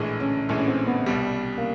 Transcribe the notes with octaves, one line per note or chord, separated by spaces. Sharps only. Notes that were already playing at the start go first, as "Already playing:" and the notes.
Already playing: A#1 A2 E3 G#3
C#4
A#1 A2 E3 G#3
C#4
C4
B3
C2 B2 G3
A#3